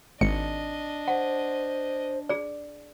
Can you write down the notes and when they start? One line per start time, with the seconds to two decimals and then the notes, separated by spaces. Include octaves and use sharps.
0.21 G#1 D4 D#5 C#7
1.08 C5 F#5
2.29 G#4 D5